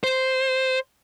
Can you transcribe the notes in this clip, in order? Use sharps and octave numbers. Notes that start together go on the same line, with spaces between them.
C5